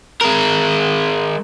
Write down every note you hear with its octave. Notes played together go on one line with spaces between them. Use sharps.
G#3 A#4